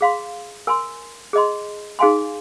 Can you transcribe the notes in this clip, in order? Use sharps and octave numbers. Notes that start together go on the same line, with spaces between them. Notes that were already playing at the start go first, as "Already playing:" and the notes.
G#4 F5 C6
A#4 G#5 C6
G#4 D#5 C6
D#4 G#4 F5 G#5 C6